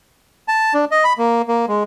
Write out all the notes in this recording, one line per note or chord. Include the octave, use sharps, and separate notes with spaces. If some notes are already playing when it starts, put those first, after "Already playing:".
A5
D4
D#5
B5
A#3
A#3
G#3